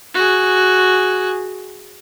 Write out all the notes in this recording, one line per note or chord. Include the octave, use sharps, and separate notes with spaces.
F#4 G#4